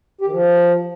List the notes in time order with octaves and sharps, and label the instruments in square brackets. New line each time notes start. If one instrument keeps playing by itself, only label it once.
[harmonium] G4
D#3
F3